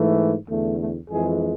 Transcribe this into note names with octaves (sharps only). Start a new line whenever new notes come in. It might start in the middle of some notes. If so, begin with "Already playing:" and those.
Already playing: G#2 E3 A3
E2 D3 A3
A3
F2 E3 G#3 G#4